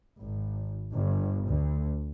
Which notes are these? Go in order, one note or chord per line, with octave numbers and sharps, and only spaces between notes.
G#1
G1
D2